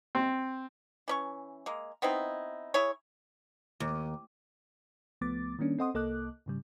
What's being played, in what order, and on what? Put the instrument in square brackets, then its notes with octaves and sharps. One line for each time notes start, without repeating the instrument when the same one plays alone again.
[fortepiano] C4
[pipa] E3 C#4 C#6
G#3 A#3
B3 C4 D#4 E4
E4 G#4 C#5
[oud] D#2
[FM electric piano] C#2 F3 A3 B3 D6 A6
D#3 G3 A#3 C#4 D4
C4 A4 D#5 F#5 C6 D#6
C2 A#3 A4 D#5 D6 F#6
G#2 C#3 G3